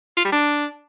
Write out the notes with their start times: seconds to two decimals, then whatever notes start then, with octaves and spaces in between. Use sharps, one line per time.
0.17 F4
0.25 G3
0.32 D4